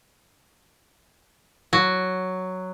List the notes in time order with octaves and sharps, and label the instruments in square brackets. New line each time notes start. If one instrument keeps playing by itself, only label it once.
[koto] F#3